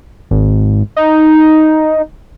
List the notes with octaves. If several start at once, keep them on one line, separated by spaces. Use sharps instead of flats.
G#1
D#4